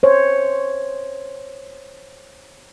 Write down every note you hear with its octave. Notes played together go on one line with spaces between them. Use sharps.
C5 C#5